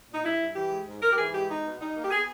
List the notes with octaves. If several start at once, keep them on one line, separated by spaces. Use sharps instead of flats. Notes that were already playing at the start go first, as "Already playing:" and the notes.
A#2 D#4
G2 E4
G2
E3 G4
G#3
G#2
G#2 A#4
G4
E3 G#4
G#3 G4
B2 D#4
B2
G3 D#4
A#3
G4
B3 G#4